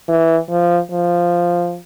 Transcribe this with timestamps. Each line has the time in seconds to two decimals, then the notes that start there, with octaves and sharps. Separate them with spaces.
0.09 E3
0.50 F3
0.91 F3